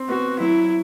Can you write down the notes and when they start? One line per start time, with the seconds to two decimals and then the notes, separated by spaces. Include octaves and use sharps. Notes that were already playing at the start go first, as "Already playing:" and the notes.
Already playing: C4
0.09 B3 F#4
0.39 F#3 E4